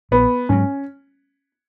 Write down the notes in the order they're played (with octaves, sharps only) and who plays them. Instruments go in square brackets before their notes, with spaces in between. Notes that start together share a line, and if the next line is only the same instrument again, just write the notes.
[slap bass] A#1 [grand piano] B3
[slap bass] G#2 F#3 [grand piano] C#4